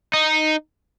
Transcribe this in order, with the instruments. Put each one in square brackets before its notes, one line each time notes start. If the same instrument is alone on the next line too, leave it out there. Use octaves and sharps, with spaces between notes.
[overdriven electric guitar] D#4